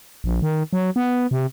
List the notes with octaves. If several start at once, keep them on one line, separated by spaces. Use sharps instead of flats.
A#1
D#3
F#3
B3
C3